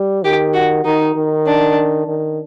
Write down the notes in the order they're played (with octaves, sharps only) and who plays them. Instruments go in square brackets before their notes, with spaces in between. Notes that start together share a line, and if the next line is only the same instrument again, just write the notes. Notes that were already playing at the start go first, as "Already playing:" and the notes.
Already playing: [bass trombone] G3
[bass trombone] D#3 [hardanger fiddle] G4
[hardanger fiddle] F#4
[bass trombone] D#3 [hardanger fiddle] D#4
[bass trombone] D#3
[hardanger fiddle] D4
[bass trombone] D#3